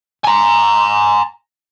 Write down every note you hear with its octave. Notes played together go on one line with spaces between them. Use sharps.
G#5 A#5